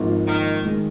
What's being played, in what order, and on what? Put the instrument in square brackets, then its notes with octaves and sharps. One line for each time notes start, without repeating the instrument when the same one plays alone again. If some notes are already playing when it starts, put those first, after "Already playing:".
Already playing: [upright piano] G#1 G#2 F3 A#3 F4
[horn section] D#3
[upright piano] D#3 G#3